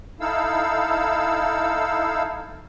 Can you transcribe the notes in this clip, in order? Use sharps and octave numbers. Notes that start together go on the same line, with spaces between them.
D#4 E4 A4 F5 E6